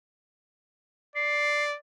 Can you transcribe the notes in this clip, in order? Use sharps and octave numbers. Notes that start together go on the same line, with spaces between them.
D5 C7